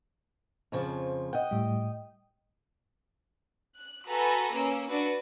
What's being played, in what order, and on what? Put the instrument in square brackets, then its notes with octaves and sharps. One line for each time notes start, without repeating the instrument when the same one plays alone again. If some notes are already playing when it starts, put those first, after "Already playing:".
[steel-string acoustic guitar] F2 C#3 F3
[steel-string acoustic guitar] D#5 G5 [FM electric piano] F#5
[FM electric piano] A2 G3
[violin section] F#6
F#4 A4 B4 G#5 A#5 B5
A#3 C#4 E6
D4 F#4 B4